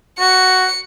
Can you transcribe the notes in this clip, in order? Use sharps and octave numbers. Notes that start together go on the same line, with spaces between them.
F#4 C#7